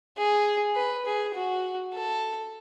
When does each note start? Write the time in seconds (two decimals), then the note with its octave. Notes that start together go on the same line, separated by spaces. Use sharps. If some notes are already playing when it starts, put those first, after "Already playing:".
0.18 G#4
0.76 B4
1.06 G#4
1.35 F#4
1.94 A4